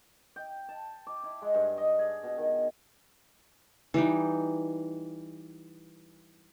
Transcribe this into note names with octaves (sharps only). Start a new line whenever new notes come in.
G5
A5
D6
E4
G#3
G2
D#5
G#4
B2
D#3
E3 G3 D#4